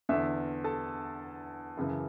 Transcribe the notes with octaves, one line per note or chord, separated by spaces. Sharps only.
E2 D3 E5
A4 A5
F#2 C#3 E3